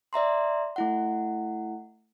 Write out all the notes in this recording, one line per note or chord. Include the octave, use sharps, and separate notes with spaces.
D5 E5 A#5 C6
A3 E4 F#5